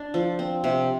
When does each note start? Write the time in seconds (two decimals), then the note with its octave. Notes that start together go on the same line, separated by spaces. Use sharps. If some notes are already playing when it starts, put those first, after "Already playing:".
Already playing: D4
0.14 F3
0.39 C4
0.64 C3